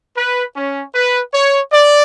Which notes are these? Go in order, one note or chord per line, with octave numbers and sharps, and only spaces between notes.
B4
C#4
B4
C#5
D5